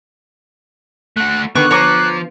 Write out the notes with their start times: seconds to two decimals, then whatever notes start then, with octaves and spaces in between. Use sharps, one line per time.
1.17 A3 F#4 F#6
1.55 D3 D#3 B3 C#6 D6 F#6
1.71 F3 C#5 A#5 D6